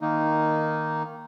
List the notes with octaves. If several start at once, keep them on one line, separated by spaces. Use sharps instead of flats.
D#3 A#3 D#4